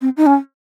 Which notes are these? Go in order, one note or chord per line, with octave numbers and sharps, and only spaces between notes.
C4
D#4
C#4